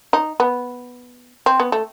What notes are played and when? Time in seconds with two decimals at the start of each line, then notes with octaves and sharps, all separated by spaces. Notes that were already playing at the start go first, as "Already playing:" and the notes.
0.13 D#4
0.40 B3
1.46 C4
1.60 B3
1.72 A3